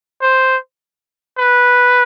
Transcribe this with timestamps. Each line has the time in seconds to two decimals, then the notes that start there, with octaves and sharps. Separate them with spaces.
0.22 C5
1.38 B4